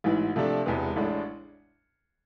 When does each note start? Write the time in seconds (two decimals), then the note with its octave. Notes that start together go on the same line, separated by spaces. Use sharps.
0.04 A1 G#2 E3
0.36 C3 F3 A3 D4 A4
0.66 E1 E2 C3 G#3 B3
0.96 A1 A2 G#3 D4